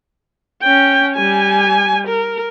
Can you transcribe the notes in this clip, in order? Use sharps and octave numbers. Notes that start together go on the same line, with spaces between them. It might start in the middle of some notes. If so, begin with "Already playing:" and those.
C#4 G5
G3 G#5
A#4